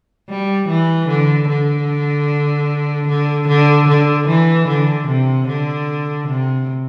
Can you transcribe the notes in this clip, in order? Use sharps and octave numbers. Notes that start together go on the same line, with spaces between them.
G3
E3
D3
D3
D3
D3
D3
E3
D3
C3
D3
C3